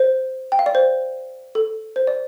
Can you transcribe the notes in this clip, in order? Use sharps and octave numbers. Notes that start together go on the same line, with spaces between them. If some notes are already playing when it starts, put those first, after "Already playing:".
Already playing: C5
G5
F5
D5
C5
A4
C5
D5